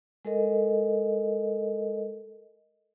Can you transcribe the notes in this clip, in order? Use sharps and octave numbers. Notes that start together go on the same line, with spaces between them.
G#3 A4 A#4 D#5